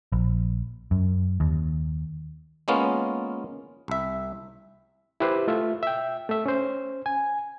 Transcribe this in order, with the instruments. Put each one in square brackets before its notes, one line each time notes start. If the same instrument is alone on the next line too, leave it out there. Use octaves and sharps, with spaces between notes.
[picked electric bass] A#1
F#2
D#2
[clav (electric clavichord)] G#3 A#3 B3 C#4 F4
C2 E5
[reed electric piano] E4 G4 B4 C5
A3 F4 E5
E5 G5
A3 E5
C#4 C5
G#5